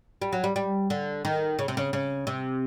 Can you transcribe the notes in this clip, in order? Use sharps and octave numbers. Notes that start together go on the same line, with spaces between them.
G3
F#3
G3
G3
D3
D#3
C#3
C3
C#3
C#3
C3